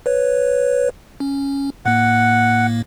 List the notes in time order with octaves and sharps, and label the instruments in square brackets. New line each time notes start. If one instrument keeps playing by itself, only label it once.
[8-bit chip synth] B4 C#5
C#4
[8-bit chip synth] A2 A#3 [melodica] F#5